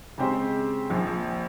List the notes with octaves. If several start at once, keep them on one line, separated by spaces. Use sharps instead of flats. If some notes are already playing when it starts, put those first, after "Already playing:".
C#3 G#3 C4 G4 C5
A#1 A#2 F3